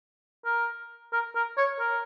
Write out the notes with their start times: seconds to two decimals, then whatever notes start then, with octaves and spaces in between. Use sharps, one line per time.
0.45 A#4
1.13 A#4
1.35 A#4
1.57 C#5
1.80 A#4